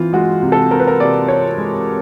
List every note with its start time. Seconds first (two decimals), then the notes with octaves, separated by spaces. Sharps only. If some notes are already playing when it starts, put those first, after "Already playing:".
Already playing: E3 C4 F4
0.13 G#3 F#4
0.43 C3
0.52 A4
0.71 C4 A#4
0.80 B4
0.88 A#4
1.00 C3 D5
1.28 C4 C#5
1.57 G#3